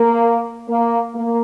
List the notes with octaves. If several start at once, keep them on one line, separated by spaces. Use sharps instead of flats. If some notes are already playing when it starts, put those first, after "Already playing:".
Already playing: A#3
A#3
A#3